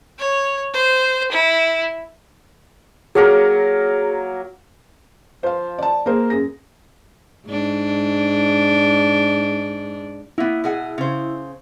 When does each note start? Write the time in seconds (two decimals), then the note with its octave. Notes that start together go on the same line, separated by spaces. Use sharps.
0.19 C#5
0.73 C5
1.32 E4
3.15 F#3 A#3 G#4 A#4
5.43 F3 C5 F5
5.79 D5 A5
6.06 A#3 G#4 A#4 C5
6.30 F#2 G#4 A#6
7.46 G#2 D4
10.38 A#3 B3 E4
10.64 B2 G#4 F#5
10.98 C#3 C5